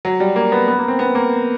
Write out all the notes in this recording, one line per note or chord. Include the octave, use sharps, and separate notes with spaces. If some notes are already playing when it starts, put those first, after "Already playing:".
F#3
G3
A#3
B3
B3
A#3
C4
B3
A#3